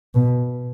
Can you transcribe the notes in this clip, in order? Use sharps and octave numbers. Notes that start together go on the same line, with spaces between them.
B2